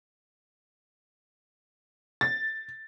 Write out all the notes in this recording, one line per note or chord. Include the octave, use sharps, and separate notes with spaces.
A6